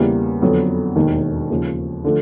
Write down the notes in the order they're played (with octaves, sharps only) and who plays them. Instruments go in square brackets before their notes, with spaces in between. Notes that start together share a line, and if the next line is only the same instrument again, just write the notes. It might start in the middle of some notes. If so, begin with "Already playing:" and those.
Already playing: [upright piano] E2 C#3 E3 G3 A#3
F2 D3 F#3 B3
E1 D#2 D#3
D#2 C#3 F3
D3 F3 A3 D4